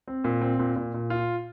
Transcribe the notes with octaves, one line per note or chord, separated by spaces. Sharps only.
C4
A#2
C4
A#2
A#2
A#2
F4